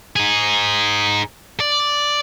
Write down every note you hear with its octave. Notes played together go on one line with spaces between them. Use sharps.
D#4 G#4
D5